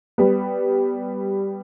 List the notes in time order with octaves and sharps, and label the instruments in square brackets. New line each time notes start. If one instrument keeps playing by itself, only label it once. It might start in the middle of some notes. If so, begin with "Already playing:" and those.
[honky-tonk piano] G3 B3